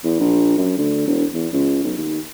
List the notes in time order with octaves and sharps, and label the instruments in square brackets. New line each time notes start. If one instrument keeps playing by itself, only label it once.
[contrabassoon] E2
A#1
F#2
D2
E1
E2
C#2
B1
D#2